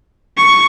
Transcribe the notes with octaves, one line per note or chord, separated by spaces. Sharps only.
C#6